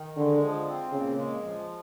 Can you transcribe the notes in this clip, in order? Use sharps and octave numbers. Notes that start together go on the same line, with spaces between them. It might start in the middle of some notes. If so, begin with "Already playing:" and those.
Already playing: D#3
D3 G#3
F3
C4
A#2 C#3
G#3
F3